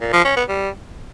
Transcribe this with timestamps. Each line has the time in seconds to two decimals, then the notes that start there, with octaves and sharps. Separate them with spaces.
0.01 A#2
0.13 F3
0.25 C#4
0.37 B3
0.48 G3